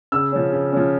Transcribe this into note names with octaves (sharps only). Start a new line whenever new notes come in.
C#3 E6
F3 C#4
C#3
F3 C#4